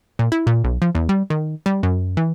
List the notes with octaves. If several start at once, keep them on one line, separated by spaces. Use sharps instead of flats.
A#2
E4
A#2
B1
F3
E2
G3
D#3
G3
F#2
E3